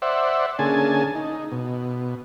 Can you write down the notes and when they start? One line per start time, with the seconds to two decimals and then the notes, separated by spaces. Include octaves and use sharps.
0.02 C5 D5 E5 F#5
0.59 D3 A#3 C#4 G#4 G#5 A5
1.15 D#4
1.52 B2